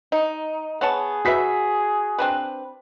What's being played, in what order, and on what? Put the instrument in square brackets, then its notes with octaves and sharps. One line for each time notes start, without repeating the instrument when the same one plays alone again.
[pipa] D#4
[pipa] B3 C#5 A5 [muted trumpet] G#4
[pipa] F#3 B4 E5 [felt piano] F#4 B6
[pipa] C4 D4 B4